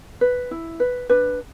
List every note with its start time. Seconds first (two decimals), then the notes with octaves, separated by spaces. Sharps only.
0.21 B4
0.51 E4
0.80 B4
1.10 D4 B4